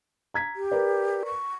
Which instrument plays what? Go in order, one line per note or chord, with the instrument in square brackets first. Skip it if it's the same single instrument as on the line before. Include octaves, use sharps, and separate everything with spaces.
[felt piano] A#5 G#6 B6
[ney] G4
[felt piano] A#4 B4 D5
[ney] C#6